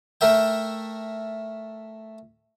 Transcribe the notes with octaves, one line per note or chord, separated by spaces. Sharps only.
A3 A#4 E5 G5